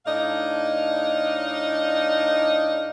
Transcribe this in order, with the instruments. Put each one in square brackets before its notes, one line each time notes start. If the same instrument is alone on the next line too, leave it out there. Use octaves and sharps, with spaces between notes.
[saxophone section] A2 D4 D#4 D#5 F5